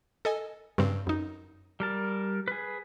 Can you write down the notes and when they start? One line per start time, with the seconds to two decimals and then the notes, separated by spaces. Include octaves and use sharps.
0.25 A4 D#5 G#5
0.78 G2 C#3 C4
1.07 F#2 D#4
1.80 G3 A#4 A5
2.48 G#4 B4